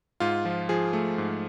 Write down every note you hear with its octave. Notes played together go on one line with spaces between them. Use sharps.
G#2 F4
F3
F3 G#4
A3
G#2